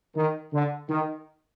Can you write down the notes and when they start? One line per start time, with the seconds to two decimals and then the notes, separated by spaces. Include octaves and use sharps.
0.15 D#3
0.53 D3
0.89 D#3